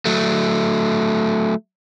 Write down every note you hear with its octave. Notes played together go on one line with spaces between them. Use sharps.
F#3 A3